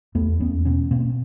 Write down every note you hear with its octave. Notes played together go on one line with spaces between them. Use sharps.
E2 A3 B3
E2 B3 C#4
B2 B3 C#4
B2 A#3 C4